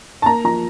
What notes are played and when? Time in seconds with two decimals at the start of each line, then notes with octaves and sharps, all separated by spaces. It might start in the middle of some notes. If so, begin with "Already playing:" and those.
0.22 A5
0.26 A#3 A#5
0.44 F3 A#5